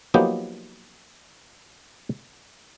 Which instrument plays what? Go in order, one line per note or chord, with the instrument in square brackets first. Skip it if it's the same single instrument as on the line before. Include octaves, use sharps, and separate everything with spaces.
[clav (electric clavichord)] F3 F#3 A#3 B3 D#4 G4